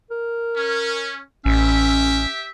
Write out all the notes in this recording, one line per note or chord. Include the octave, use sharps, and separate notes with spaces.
A#4
C#4
A1 C#4 G4 E5